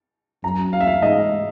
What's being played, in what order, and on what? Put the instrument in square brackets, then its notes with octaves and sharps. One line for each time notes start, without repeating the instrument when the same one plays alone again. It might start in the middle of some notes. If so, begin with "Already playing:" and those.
[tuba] F#2 [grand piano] A#5
[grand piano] F5
E5
F5
[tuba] G#2 [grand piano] D#5